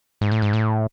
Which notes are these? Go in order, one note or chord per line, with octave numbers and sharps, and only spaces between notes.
G#2
A2
G#2
A2